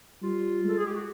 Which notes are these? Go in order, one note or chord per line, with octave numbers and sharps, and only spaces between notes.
G3 F4
G#3 A4
G#4
G4
F#4